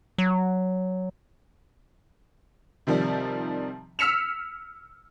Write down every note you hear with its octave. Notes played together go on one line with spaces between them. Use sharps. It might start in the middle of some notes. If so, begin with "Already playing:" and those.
F#3
C3 D#3 F3 G3
E6 F6 B6 C#7 E7 F7